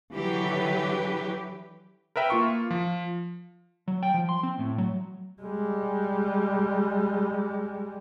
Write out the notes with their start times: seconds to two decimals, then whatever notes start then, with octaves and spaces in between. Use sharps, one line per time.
0.14 D3 E3 F#3 G4 B4
2.16 A#4 B4 E5 G5
2.30 A#3 F4 C#6
2.71 F3
3.88 F#3
4.03 G5
4.14 F3
4.29 C6
4.43 C4
4.59 A2
4.78 F#3
5.42 G3 G#3